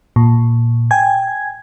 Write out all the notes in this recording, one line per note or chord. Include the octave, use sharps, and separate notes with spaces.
A#2
G5 G#5 G#6